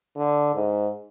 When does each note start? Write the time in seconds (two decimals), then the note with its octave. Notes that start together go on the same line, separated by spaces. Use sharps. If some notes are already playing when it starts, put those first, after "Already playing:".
0.17 D3
0.55 G#2